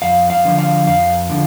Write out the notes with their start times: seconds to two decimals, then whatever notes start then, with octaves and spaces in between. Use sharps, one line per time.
0.02 F2 F5
0.30 F5
0.45 D3 F3
0.59 F5
0.87 F2 F5
1.30 D3 F3